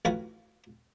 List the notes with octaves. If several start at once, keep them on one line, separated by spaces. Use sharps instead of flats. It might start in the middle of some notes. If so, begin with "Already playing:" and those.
A1 F4 F#4 B4 G#5